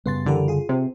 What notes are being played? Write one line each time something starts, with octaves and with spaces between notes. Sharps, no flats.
F#2 C#3 G3 B3 C6 A6
D3 E3 G4 A#4
F4 G#4
C3 C4